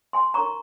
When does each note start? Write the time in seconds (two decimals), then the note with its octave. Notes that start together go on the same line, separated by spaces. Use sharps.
0.13 G#5 C6
0.34 D#4 A#4 C#5 A#5 C#6